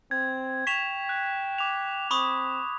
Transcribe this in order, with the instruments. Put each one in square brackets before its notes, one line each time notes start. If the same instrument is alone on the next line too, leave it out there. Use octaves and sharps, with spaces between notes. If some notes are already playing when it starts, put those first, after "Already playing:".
[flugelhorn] C4 [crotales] G#6
[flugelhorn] G5 [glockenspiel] C#6 F7 [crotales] B6 E7
[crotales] F#6
D6 F7
[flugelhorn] C4 [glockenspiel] B5 C#6 D#6